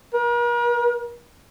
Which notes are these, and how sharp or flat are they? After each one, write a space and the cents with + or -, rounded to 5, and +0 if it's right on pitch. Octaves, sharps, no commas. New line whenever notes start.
A#4 +45